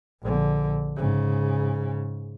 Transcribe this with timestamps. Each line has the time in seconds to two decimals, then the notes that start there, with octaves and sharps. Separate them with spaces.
0.22 A#1 D3
0.96 G#2 C#3